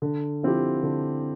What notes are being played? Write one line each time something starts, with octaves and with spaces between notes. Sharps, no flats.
D3
F3 C4 E4 G4
D3